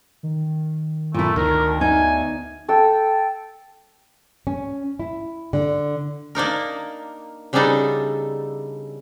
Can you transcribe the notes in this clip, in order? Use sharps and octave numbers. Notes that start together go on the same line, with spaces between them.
D#3
A#2 A3 E4
D2 D#3 A#4
B3 D#4 G#5
A4 G5
C#4
E4
D3
A#3 D4 D#4 A#4
C#3 G3 B3 D4 D#4 A4